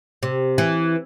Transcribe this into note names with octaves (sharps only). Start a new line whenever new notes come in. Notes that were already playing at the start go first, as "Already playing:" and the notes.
C3
E3